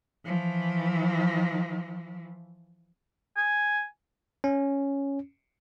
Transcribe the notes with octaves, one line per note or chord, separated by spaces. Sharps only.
E3 F3
G#5
C#4